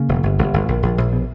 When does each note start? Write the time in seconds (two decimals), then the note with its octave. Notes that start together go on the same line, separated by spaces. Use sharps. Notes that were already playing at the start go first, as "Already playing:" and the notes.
Already playing: C#3 A#3
0.09 E1
0.23 G1
0.38 G1
0.54 G1
0.68 A#1
0.83 A#1
0.98 A#1
1.13 B2